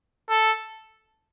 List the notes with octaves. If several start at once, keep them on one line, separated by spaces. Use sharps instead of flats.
A4